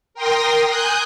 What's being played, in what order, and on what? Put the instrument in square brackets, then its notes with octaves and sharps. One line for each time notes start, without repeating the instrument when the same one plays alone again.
[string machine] A#4 G5 C6 D#6 A#6
G#5 D#6 F#6 G6